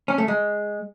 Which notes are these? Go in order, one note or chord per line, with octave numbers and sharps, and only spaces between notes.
C#4
A3
G#3